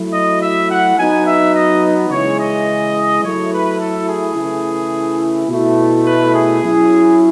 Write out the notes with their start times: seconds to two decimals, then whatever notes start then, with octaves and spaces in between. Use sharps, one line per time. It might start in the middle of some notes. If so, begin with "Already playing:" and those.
Already playing: F#3 A3 E4
0.14 D#5
0.42 E5
0.70 F#5
0.98 F#3 B3 D#4 G#5
1.26 E5
1.55 D#5
2.11 C#3 E3 G#3 C#5
2.39 D#5
3.23 F#3 A3 E4 C#5
3.52 B4
3.80 A4
4.08 G#4
4.36 C#3 E3 A3 E4
5.49 B2 A3 E4
6.05 B4
6.34 G#4
6.62 F#3 C#4 E4